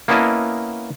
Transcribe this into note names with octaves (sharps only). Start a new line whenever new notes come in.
A#3 B3 C#4 E4 D#5 A5